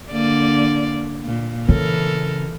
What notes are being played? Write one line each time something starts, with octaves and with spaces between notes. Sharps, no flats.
D3 A#3 D5
A#2
C#3 E3 A4 A#4